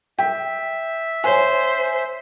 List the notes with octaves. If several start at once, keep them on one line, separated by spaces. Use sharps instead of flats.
E5 G5
C5 C#5 G#5